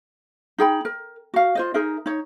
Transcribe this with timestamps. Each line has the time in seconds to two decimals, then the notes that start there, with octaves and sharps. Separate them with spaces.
0.58 D#4 G#4 G5 B5
0.85 A#4
1.34 F#4 F5
1.55 F4 C5 D#5
1.74 D#4 G#4 A#4 E5
2.06 D#4 C#5